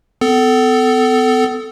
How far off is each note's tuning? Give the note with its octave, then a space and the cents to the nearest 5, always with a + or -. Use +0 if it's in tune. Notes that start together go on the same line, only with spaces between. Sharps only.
B3 +40 A4 +0